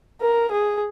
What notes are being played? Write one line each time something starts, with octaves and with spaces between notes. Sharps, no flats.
A#4
G#4